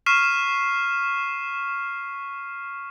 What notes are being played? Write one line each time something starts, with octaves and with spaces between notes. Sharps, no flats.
C#6 F6 B6 C7 D#7 E7